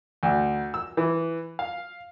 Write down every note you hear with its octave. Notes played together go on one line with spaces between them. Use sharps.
D2
E6
E3
F5